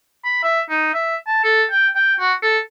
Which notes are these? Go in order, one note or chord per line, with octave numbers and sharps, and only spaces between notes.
B5
E5
D#4
E5
A5
A4
G5
G5
F#4
A4